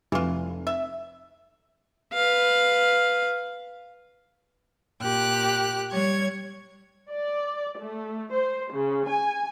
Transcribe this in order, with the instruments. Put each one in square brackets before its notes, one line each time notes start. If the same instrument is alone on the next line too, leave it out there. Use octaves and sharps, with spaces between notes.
[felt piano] F1 [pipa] E3 F4
[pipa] E5
[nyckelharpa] B4 F5
[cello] A#2 [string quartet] G4 F#6
[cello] G3 [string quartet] C#5 G#6
[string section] D5
A3
C5
C#3
G#5